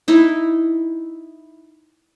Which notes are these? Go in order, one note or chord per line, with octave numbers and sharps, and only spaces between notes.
D#4 E4